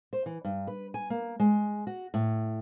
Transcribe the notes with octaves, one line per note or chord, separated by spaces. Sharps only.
C5
E3
G2
B4
G#5
A#3
G#3
F#4
A2